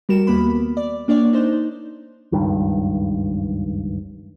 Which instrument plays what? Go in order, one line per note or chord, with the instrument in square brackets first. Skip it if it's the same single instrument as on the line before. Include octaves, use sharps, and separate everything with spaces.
[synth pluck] G3 F#4 A#4 E7
D#2 A#3 B3 B5
D5
A#3 D4 C#5 D5
D4 D#4 C5
[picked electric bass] F#1 C#2 G2 D#3